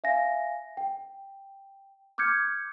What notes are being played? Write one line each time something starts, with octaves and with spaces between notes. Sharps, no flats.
E5 F5 G#5 A#6
G5
D6 F6 G6 G#6 C#7